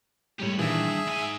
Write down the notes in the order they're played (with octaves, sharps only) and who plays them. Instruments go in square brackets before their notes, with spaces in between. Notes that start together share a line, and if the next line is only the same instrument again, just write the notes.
[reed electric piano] A2 G3 G#3 [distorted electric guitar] G4 C#5
[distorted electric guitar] G2 [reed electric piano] A#2 D#3 E3 [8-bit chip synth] G#4 E5
[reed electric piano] D#6
[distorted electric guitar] G#2 G#5